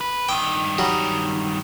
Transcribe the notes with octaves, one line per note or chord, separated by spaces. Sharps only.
B4
G2 D#3 G5
F#3 G3